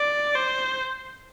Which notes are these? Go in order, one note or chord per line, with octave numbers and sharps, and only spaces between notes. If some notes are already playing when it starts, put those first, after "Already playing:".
Already playing: D5
C5